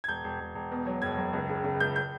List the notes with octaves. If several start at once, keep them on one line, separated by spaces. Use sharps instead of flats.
G#6
E1 G6
E1
E1
E1
B2
F#3
F#1 G#6
F#1
C#2
C#3
C#3
C#2 G6
G6